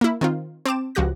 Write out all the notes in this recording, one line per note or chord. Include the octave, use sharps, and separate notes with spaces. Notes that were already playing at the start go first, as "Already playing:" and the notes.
A#3 E4
D#3 C4 F4
C4 A5 D6 E7
C#2 F3 F#4 G4 F#6 A#6